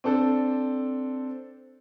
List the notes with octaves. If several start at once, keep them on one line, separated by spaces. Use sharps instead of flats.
C4 D4 A4 C5